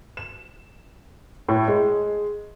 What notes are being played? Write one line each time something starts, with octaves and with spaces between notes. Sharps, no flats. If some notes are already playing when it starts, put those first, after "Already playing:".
E7
A2
G#3